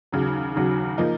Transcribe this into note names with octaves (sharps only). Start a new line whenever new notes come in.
D#2 C#3 F#3
D#2 C#3 F#3
F3 A#3 D#4